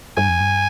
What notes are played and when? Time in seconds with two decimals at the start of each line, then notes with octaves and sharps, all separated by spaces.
0.17 G2 G#5
0.29 F2
0.40 G2